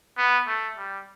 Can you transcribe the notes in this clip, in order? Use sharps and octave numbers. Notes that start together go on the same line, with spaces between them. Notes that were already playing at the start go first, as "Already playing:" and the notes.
B3
A3
G3